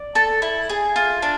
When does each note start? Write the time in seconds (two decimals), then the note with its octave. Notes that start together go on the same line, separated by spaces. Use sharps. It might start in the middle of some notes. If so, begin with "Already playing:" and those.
Already playing: D5
0.15 A4
0.42 E4
0.69 G#4
0.96 F4
1.22 D4